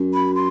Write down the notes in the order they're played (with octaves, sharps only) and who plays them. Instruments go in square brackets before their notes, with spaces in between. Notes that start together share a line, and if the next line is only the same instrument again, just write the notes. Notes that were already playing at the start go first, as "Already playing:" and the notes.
Already playing: [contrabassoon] F#2
[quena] B5
C6